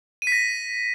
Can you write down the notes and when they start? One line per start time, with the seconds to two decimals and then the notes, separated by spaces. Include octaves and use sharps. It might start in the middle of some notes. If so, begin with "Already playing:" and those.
0.22 D#7
0.27 B6
0.32 A#6